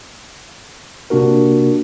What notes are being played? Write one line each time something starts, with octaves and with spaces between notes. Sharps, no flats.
C3 A#3 D4 F#4 A#4